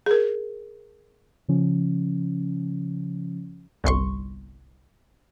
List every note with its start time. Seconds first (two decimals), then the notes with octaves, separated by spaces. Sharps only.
0.06 G#4 A#4
1.48 C#3 F3 C#4
3.84 G1 C2 C6 C#6